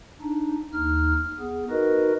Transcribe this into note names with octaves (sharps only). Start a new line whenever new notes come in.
D4 D#4
D#2 D#4 F6
B3 G#4
D#4 F#4 A#4 B4 D#5